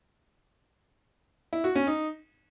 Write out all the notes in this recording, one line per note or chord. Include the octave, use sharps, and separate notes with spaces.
E4
F#4
C#4
D#4